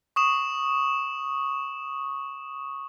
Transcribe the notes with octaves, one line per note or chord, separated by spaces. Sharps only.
C#6 D#6 E7